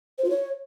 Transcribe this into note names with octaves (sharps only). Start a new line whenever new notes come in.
C5
F4
C#5